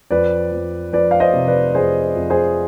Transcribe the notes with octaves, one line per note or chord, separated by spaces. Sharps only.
F2 B4 D5
F2
F2 B4 D5
F5
C5 D#5
C3
B4 D5
F2 G#4 C5
F2
G#4 C5